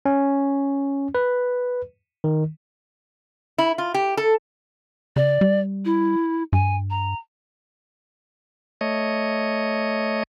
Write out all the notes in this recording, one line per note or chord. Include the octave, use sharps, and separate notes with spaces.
C#4
B4
D#3
E4
F4
G4
A4
C#3 D5
G3
E4
G2 G#5
A#5
A3 C#5 D#5